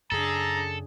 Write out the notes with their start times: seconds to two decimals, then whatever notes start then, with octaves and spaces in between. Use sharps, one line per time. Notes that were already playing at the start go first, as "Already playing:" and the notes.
0.12 F#2 C#3 D4 G#4 A4 A#5